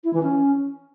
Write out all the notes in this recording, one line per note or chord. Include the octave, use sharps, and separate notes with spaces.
E4
E3
C#4